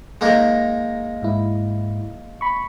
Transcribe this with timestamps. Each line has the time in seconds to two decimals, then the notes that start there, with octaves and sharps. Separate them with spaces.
0.21 G#3 A#3 D#4
1.22 G#2 E4
2.41 B5 C#6